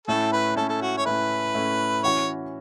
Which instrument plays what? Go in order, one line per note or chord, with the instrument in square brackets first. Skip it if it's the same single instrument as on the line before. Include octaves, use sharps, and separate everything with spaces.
[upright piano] A2 A3 C#4 E4 [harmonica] A4
[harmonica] B4
[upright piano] A2 A3 C#4 E4 [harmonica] A4
[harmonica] A4
F#4
C#5
[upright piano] A2 A3 C#4 E4 [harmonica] B4
[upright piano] A2 A3 C#4 E4
[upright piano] E3 C#4 F#4 [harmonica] C#5